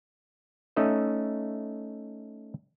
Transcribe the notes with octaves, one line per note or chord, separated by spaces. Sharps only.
A3 C#4 D#4 D#5 E5